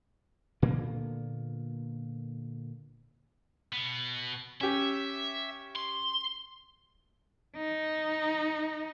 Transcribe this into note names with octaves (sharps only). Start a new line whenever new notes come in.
A#2 D3 A#3 B3
B2 B3
C#4 G4 E5
C6
D#4